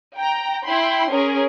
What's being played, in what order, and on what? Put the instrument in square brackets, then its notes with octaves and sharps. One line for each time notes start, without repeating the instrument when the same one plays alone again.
[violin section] G5 A#5
E4 G5 B5 C6
C#4 G#4 A#4